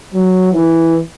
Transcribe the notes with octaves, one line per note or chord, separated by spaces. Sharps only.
F#3
E3